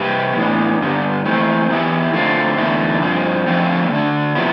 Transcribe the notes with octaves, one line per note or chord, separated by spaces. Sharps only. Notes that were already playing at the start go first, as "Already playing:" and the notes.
Already playing: C3 G3 C4 G4 B4
A2 E3 B3 D4
G2 D3 G3 B3
E3 A3 C4
E3 B3 E4 G4
D3 A3 C4 F4
E2 D3 A3 E4
G2 F3 C4
D3 F3 A3 C4
D3 A3 D4
C3 F3 B3 E4